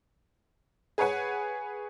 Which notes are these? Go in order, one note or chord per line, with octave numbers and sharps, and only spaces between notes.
G#4 B4 C#5 F#5 G#5